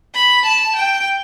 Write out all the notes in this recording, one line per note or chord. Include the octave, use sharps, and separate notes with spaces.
B5
A5
G5